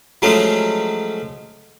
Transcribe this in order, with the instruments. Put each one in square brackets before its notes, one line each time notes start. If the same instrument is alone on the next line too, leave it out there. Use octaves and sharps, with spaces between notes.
[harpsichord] F3 F#3 G#3 A3 C#4